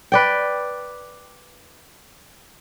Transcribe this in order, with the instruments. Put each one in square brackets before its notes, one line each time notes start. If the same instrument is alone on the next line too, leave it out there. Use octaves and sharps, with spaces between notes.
[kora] B4 D5 G5